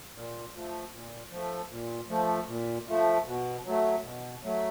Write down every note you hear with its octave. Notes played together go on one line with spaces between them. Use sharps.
A#2
F3 A3
A#2
F3 A3
A#2
F3 A3
A#2
F3 A3
B2
F#3 A3
B2
F#3 A3